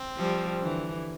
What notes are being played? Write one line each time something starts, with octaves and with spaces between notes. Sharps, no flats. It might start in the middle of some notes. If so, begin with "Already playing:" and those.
Already playing: C4
F3 G3
D3 E3